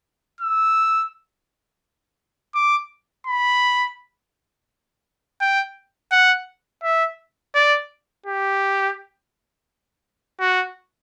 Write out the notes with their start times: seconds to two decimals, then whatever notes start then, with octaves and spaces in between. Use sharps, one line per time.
0.41 E6
2.55 D6
3.27 B5
5.41 G5
6.12 F#5
6.83 E5
7.55 D5
8.26 G4
10.40 F#4